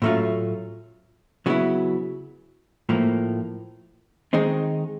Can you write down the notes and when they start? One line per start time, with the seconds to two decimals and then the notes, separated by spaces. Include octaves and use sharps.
0.02 A2 F#3 A3 C#4 F4
1.46 C#3 F#3 B3 E4
2.89 A2 F3 A#3
4.33 D#3 G#3 C4 D#4